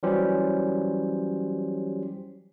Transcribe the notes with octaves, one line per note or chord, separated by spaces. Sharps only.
E3 F#3 G3 C#4 G4 C5